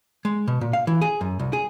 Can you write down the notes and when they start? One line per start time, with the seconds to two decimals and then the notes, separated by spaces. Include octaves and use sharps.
0.25 G#3
0.48 B2
0.61 A#2
0.73 F5
0.87 E3
1.01 G#4
1.21 F#2
1.39 C2
1.53 G#4